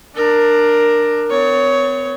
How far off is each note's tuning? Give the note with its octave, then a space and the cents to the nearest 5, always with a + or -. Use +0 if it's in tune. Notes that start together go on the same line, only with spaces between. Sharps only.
D4 +15 A#4 +0
C4 -45 C#5 +10